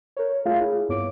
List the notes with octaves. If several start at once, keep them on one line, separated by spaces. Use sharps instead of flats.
A#4 C#5
A3 F4 G#4 E5 F5
E4
G2 B3 C#5 D6 D7